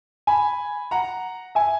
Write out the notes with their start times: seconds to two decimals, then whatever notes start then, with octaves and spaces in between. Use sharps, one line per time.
0.27 G#5 B5
0.91 F#5 A#5
1.55 E5 G#5